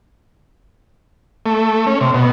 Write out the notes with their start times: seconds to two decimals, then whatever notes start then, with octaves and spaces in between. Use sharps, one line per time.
1.46 A3
1.87 C#4
2.01 C3
2.14 B2